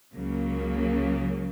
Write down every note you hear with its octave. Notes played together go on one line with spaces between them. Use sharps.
C#2 C#3 F#3 A#3